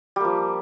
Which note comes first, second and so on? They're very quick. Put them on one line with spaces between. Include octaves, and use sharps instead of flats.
G3 A#3 F3